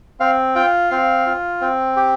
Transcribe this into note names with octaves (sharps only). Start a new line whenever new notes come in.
C4 F5
F4 G5
C4 F5
F4
C4
G4